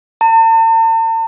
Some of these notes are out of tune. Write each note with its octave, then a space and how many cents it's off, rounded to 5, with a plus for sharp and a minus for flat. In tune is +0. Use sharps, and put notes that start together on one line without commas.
A5 +45